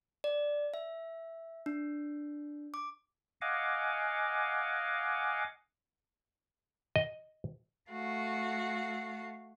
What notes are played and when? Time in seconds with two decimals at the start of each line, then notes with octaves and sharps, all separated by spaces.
0.24 D5
0.74 E5
1.66 D4
2.74 D6
3.41 D#5 F5 F#5 G#5 D6
6.96 D#5
7.90 A3 F#4 F5